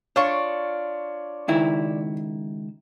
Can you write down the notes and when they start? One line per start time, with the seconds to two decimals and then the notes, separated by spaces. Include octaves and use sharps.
0.16 D4 F4 C#5 C#6
1.48 C#2 D#3 E4